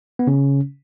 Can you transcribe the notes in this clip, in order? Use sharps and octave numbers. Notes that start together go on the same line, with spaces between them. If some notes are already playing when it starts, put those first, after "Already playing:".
B3
C#3 C#4